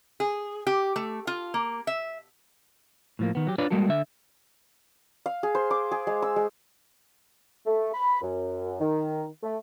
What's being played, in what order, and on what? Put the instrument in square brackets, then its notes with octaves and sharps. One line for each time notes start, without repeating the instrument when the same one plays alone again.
[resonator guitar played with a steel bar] G#4
G4
A3
F4
A#3
E5
[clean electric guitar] A2 F3 A#3
D#3 B3
F#3 G4
D4 F4 B4 C#5 D5
G3 G#3 A#3 F#4 A4
D3 E5
[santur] F5
G#4
C5
D6
G#4
G#3
E6
G#3
[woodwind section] A3
B5
F#2
D#3
A3